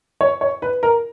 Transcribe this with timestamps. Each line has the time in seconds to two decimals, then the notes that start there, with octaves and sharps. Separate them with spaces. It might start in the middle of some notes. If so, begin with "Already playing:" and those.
0.21 C#5
0.41 C#5
0.62 B4
0.83 A#4